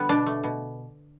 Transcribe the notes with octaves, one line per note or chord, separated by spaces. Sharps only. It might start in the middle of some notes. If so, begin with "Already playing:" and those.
Already playing: D3 G3 B3
B2 D4
A3
B2